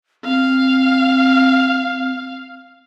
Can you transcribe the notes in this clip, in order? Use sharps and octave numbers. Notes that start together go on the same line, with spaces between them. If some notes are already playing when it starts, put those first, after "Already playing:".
C4 F5